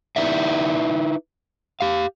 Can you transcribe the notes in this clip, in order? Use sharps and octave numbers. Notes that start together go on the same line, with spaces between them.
D#4 E4 B4 D5 E5
G4 F5